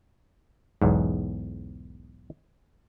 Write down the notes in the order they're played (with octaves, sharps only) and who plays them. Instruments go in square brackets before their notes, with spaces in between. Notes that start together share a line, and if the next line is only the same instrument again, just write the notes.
[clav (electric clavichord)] B1 E2 G#2